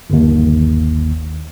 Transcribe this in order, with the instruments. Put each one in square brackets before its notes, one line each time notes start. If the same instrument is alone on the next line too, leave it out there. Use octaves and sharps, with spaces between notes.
[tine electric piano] G1 D#2